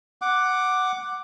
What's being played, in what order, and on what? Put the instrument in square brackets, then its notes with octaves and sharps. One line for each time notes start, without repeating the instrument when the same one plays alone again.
[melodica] F#5 D6